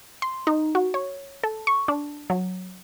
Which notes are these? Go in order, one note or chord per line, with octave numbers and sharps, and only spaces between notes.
C6
D#4
F#4
C#5
A4
C#6
D4
F#3